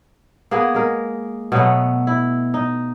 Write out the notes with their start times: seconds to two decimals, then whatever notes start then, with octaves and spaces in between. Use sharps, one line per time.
0.51 A#3 B3 G#4
0.75 G#3 A#4
1.52 B2 F#3 A3 B3
2.07 E4
2.54 D#4